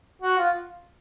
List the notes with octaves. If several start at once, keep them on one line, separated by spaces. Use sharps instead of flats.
F#4
F4